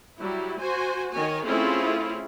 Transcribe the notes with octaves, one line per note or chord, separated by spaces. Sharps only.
F#3 G3 E4
F#4 C5 G#5
D#3 C#5 G#5
A3 C4 C#4 E4 F4 G#4